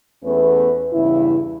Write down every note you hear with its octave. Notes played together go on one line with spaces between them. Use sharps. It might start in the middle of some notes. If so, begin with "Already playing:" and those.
E2 A3 B3 C#4 B4
E2 G2 C#3 E4